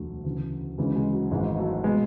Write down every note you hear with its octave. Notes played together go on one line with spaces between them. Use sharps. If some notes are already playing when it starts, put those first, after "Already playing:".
Already playing: E1 D2 D3 F#3 A3
D2 C#3 E3
D2 C#3 E3 G#3
G#3
F#3
G#1 G#2 E3 G#3
F#3 A3
B2 G#3 B3